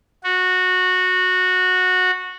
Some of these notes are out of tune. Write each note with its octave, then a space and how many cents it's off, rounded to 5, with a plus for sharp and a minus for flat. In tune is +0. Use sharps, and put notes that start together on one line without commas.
F#4 -15